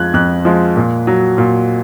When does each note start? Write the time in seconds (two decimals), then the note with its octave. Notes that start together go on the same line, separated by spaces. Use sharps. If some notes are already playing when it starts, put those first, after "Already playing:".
Already playing: F2 F3 G#3 F#6 G#6
0.14 F2 F#6
0.45 F3 G#3
0.76 A#2
1.07 F#3
1.38 A#2